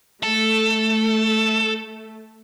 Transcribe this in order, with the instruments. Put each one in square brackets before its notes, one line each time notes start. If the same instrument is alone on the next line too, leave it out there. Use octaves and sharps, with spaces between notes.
[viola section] A3 [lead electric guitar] A4